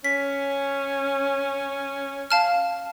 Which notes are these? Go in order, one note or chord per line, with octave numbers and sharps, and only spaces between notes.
C#4 B6
F5 A5 F6